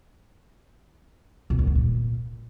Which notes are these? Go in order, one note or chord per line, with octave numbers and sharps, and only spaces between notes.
B2
F#2
C3
A#2